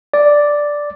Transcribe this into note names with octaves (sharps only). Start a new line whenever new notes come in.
D5